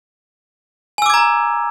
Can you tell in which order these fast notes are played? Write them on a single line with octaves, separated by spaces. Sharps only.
G#5 E6 D6 G#6 A#5